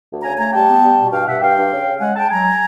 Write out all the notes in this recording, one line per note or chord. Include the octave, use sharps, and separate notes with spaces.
D2
C#3 G#5 A#5
A3 G#5 A#5
G3 G5 A5
B3
G3
B2
G2 F5 G5
G2 E5 F#5
G2 F5 G5
G2
C#3
C#3
G#3 F#5 G#5
G#3 G5 A5
F#3 G#5 A#5